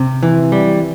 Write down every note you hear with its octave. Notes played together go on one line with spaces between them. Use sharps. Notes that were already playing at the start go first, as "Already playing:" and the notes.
Already playing: C3
E3
G3